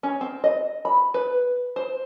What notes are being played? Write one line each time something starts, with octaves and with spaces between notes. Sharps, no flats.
C#4
C4
D#5
B5
B4
C5